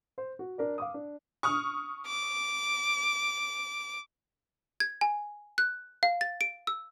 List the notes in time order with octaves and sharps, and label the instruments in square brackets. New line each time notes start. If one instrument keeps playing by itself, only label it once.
[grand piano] C5
F#4
D4 A#4 D5
F5 D6 D#6
D4
[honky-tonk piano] C#6 D#6 F6
[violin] D6
[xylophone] G#6
G#5
F#6
F5
A6
D7
E6